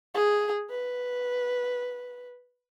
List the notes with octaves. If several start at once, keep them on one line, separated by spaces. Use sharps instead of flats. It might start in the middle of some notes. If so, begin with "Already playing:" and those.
G#4
B4